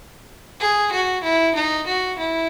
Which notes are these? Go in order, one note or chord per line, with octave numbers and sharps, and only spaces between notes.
G#4
F#4
E4
D#4
F#4
E4